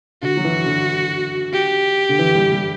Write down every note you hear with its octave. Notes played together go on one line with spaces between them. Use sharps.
D3 F#4
F#3
E3
D3
G4
D3
E3
G3
G3